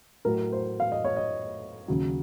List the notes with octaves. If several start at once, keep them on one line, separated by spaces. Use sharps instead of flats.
A2 F#3 A#4
C5
F5
D#5
C#5
D#5
D#2 C#3 F#3